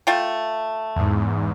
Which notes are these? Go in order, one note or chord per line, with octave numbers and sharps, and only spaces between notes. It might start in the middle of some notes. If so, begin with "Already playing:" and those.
A3 F4 G5
E2 G#2